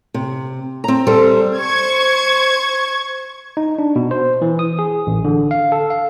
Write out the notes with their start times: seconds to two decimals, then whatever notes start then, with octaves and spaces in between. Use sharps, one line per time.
0.14 C3
0.84 C4 A#5
1.07 G3 A4 C5
1.58 C5 C#6 G#6
3.57 D#4
3.79 D4
3.96 B2
4.11 C5
4.42 E3
4.59 D#6
4.79 G#4
5.07 A1
5.25 D3
5.51 F5
5.72 A4
5.90 F5